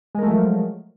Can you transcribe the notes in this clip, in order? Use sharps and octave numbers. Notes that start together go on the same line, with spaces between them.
F3 F#3 G#3 A3 A#4